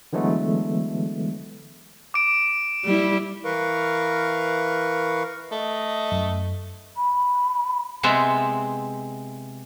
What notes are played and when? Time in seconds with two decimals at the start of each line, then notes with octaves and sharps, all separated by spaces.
0.13 D3 E3 F#3 G#3 A3 B3
2.14 D6 D7
2.84 G3 E4
3.45 E3 A#4 B4 F5 C#6
5.52 A3 D#5
6.12 F#2
6.97 B5
8.03 C3 G#3 B3 C4 G#4 E5